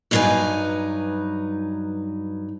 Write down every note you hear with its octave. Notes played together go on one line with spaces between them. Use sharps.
G2 F#3 D4 D#4 B4 G#5